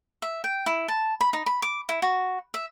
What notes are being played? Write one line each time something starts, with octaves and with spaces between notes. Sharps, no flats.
E5
G5
E4
A5
B5
D#4
B5
D6
E4
F#4
E5